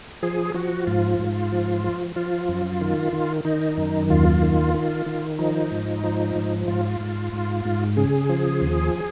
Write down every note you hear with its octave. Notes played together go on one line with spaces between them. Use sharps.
F3 G#4
F3 F#4
G#2 F4
G#2
F3
F3
F3 F4
F#2
D#3
D#3
D#3 D#4
F#2
D#2 F4
D#3
D#3
D#3
F3 D#4
G#2
F3
G#2
G#2 F4
G#2
G#2
G#2
C#3 G#4
F3
D#2